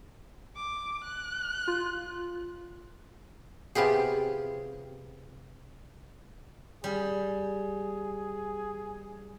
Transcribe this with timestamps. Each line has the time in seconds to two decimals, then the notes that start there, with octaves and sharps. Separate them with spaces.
0.56 D6
1.04 F#6
1.68 F4
3.75 C3 B3 F4 G4 G#4
6.84 G3 G#4